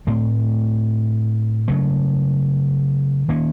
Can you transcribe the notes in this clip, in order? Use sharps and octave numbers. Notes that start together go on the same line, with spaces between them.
A2 A3 C4
C#3 F#3 A3
D#3 A#3 C#4